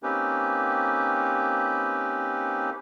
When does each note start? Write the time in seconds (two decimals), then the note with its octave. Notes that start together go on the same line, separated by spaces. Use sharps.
0.03 A#3 C4 C#4 D#4 G4 B4